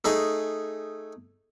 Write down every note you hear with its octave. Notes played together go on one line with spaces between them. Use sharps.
A3 D#4 G#4